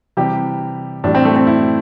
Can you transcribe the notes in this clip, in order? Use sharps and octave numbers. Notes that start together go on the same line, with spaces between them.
C3 E3 G3 G4
A2 E3 G3 D4
C4
A3
C4
E4